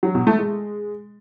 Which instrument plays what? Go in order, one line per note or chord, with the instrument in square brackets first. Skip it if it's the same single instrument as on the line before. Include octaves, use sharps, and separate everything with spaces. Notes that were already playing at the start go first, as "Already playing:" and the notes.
[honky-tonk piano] F#3
B2
A3
G#3